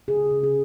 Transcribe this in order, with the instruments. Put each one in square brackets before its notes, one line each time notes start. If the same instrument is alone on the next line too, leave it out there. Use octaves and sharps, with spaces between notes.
[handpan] C#3 G#4
C#3
G#4